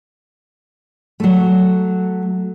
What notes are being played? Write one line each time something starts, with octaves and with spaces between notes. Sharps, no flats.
F#3 A3